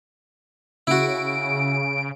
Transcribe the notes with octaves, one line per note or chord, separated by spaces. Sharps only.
C#3 E4 F#4 D7